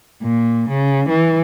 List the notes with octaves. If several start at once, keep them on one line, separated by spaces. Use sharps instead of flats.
A#2
C#3
E3